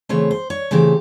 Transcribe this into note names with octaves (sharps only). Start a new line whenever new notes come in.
C#3 E3 A3 C4 C#5
C5
C#5
C#3 E3 A3 C4 G4